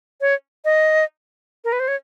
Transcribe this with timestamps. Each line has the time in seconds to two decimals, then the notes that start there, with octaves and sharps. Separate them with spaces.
0.21 C#5
0.65 D#5
1.64 A#4
1.72 B4
1.80 C5
1.88 C#5